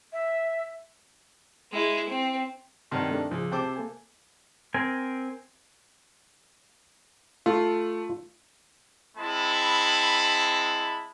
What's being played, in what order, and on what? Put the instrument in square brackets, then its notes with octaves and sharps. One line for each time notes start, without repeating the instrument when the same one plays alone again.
[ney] E5
[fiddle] G#3 E4
C4
[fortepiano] G2 C3 D#3 [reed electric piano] C#5 F#5 C6
[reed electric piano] A3 D4
[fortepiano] C#2 [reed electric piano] F3
[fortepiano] C3 C5 D6 [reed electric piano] G5 A5 E6
[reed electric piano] A#3 A4 G#5
[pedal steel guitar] C4 A#4 G#5
[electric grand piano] A3 [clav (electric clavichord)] F4
[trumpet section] G#3 C4 E4 A5 B5